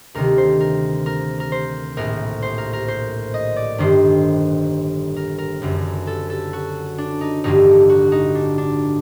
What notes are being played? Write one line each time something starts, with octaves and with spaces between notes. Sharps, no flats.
D2 C3 D#3 A#4
C5
A#4
A#4
A#4
C5
A#1 A2 A#4
C5
A#4
A#4
C5
D#5
D5
G1 G2 D#3 C5
A#4
A#4
F#1 F#2 D3
A4
A4
F#4
D4
D#4
A1 G2 D3 D#4
F#4
D#4
D4
D4